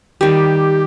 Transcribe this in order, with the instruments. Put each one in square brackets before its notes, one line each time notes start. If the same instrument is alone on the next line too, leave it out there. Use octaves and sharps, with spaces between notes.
[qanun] D#3 G3 [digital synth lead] G4